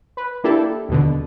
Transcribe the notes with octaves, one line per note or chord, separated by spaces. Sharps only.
B4
A#3 D4 E4 G4 A4
D#2 B2 D3